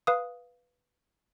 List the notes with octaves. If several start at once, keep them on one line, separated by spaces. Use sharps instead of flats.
B4 F5 D#6